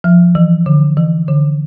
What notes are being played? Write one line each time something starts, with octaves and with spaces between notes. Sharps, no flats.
F3
E3
D3
E3
D3